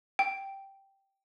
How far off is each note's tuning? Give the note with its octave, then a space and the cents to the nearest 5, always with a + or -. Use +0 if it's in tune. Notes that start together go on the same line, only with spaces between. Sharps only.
G5 -5